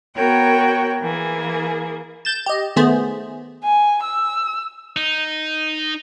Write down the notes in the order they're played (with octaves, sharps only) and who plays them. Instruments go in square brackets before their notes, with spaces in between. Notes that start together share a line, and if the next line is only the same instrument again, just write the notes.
[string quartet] B3 F#4 A#4 C#5 G5
E3 A#3 G#4
[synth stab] G6 A6 E7
G4 D#5
D#3 A3 B3 G#4 C5
[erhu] G#5
E6
[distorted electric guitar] D#4